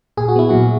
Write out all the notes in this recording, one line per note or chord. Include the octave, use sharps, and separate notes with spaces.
A#2 G#4
F#4
B3 E4
A#2 F#3 F#4